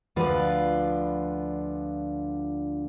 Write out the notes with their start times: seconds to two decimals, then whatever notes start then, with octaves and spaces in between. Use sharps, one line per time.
0.16 D2 D3 F3 F4 B4